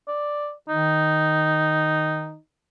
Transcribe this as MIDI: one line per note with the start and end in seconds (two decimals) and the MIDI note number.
0.08 0.52 74
0.69 2.36 51
0.69 2.39 63